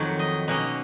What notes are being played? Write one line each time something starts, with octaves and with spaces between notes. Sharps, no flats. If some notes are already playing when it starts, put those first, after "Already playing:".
Already playing: F2 D#3 F#3 C#5
D#5
B2 A#3 C#4 D#5